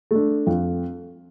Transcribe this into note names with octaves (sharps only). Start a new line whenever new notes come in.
A3 D4
F2